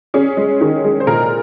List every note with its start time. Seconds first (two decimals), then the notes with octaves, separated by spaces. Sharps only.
0.14 C#4 G#4
0.37 G#3
0.61 D#3 G#4
0.84 G#3
1.00 C5
1.07 A#2 A#4